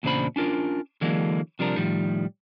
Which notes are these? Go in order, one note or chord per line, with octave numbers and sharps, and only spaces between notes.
E2 A#2 C#3 D4 C5 B5
C#4 D4 F4 A#4
D3 E3 F#3 G#3 A#3 D4
C3 F3 G3 D4 A#4
A2 D#3 F3 G3